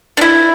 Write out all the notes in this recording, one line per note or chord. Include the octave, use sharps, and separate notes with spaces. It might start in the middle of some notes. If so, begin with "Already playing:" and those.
D4
E4